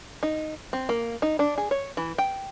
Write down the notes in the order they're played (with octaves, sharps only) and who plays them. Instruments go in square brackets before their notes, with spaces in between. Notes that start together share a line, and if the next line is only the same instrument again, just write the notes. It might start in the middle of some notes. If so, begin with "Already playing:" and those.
[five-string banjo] D#4
C4
A#3
D#4
D4
G#4
C#5
E3
G5